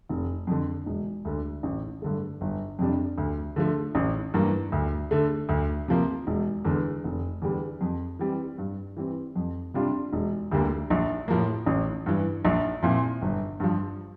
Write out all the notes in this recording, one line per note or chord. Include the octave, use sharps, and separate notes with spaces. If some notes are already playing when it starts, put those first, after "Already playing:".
F1
F2 D3
E1
D2 D3
A1
G2 D3 A3
G1
F2 C3 G3 D4
D2
D3 F3 A3
A1
G2 E3 A#3
D2
D3 A3
D2
C3 F3 A#3
E1
E2 D3
F1
E2 D3 G3
F2
E3 G3 C4
G2
E3 G3 C4
F2
C3 G3 D4 F4
E1
D2 D3 G3 A#3
A#1
A2 F3 A#3
A1
G2 E3
A#1
A#2 F3 C4 E4
G1
G2 F3